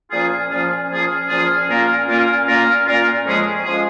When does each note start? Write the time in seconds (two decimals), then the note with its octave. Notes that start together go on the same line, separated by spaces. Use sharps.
0.11 A#2 F3 C#4 F4 G#4
0.50 A#2 F3 C#4 F4 G#4
0.90 A#2 F3 C#4 F4 G#4
1.29 A#2 F3 C#4 F4 G#4
1.68 A#2 A#3 C#4 F4 A#4
2.08 A#2 A#3 C#4 F4 A#4
2.46 A#2 A#3 C#4 F4 A#4
2.86 A#2 A#3 C#4 F4 A#4
3.25 F2 F3 G#3 C#4 G#4
3.64 F3 G#3 C#4 G#4